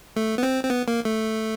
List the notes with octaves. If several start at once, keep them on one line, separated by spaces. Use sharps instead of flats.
A3
B3
C4
C4
B3
A#3
A3